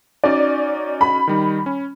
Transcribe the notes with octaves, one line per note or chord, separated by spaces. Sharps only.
C#4 D#4 F#4 D5
B5
D#3 G3 D#4
C#4